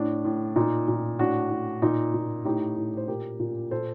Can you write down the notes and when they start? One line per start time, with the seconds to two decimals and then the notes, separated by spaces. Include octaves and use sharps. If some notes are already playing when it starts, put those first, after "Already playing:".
Already playing: A2 D4
0.25 A2
0.56 A#2 D#4
0.88 A#2
1.19 A2 D4 F#4
1.50 A2
1.82 A#2 D#4
2.14 A#2
2.45 A2 D#4 G4
2.76 A2
2.97 C5
3.08 A#2 G4 A#4
3.40 A#2
3.71 A#2 A4 C5